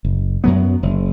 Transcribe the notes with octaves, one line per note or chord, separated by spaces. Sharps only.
F#1
F#2 F#3 B3
F#1